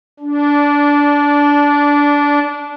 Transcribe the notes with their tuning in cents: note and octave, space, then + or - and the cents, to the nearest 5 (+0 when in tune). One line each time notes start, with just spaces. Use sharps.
D4 -20